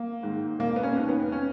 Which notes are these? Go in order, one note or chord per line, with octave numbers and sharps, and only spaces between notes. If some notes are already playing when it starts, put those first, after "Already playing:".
Already playing: A#3
G#2 D#3
E1 A#3
B3
C#4
D#2 D#3
B3
C#4